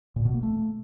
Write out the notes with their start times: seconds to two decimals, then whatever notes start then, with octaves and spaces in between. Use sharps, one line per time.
0.16 A#2
0.25 B2
0.34 A#3
0.43 A3